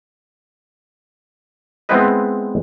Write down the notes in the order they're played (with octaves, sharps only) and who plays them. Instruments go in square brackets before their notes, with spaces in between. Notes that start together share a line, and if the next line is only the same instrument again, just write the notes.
[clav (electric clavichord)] G#3 B3 C4 E4 B4 D#5